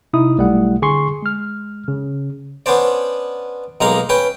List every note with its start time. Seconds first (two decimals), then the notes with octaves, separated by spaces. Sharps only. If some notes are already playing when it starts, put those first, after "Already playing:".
0.13 C3 D#4 E4 D#6
0.38 B1 G3 A3 E4 A4 F#5
0.82 D3 G#4 G#5 C6 C#6 C7
1.22 G#3 F6
1.88 C#3
2.66 B3 C#4 D4 C5 D5
3.81 B1 G#3 A#3 D#4 F5 A#5
4.09 C#4 B4 G5